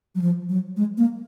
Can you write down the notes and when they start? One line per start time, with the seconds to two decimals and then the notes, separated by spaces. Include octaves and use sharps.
0.15 F#3
0.21 F3
0.49 F#3
0.77 G#3
0.97 A#3